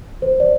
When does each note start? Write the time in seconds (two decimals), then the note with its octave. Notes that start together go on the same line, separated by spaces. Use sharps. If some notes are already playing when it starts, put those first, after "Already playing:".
0.22 C5
0.40 D5